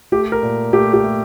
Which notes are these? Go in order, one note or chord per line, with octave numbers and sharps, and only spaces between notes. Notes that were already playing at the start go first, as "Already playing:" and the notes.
A3 G4
A#4
A#2
A3 G4
G4
A3